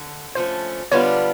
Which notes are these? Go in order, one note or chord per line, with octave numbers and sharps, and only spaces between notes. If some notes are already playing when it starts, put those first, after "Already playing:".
Already playing: D3
D3 F3 A3 C#4 C5
D3 G3 B3 D4 F4 C#5